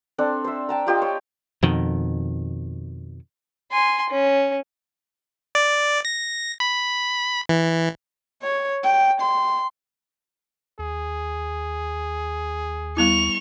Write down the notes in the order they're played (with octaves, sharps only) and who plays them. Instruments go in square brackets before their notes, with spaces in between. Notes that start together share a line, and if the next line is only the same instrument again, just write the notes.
[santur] C4 D4 A4
C5 E5
G5 A5 A#5
F4 G4 D#5 G5
C#5
[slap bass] F2 B2 D#3
[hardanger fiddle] G#5 C6
C#4
[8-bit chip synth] D5
A#6
B5
E3
[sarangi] C#5
G5
C6
[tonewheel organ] D#2 [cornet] G#4
[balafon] G3 B3 E4 [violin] C#6 F7